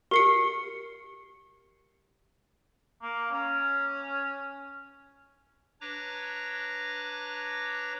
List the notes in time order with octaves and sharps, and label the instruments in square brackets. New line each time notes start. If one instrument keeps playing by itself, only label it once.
[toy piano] G4 [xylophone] A#4 C7 C#7
[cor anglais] A#3
C#4
[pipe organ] D4 B4 C#5 A#5 D6 A#6